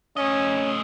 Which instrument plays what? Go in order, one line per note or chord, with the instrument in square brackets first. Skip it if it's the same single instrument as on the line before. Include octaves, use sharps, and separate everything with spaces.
[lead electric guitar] A3 D#5 [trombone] C#4